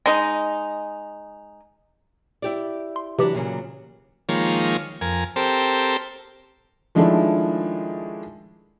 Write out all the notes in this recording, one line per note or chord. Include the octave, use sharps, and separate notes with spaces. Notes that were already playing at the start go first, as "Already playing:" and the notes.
G#3 D#4
E4 G4 D5
C6
C3 E3 F#3 D4 E4 G4
A#2 C#3 F#3
D#3 F3 G#3 A#3 C#5
F2 A#4 G#5
C4 G4 A4 A#4 C5
D#3 F3 G#3 A3 D4 E4